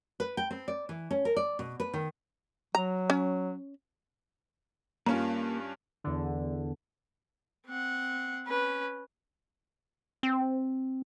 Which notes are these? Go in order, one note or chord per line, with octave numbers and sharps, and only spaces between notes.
B4
G5
C4
D5
E3
C#4
A#4
D5
B2
B4
D#3
F#3 A#5
C#4
G2 A#3 C#4 F4
E2 D3
C4 F#5
C#4 B4
C4